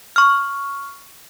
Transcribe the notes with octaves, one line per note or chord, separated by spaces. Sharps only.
C#6 F6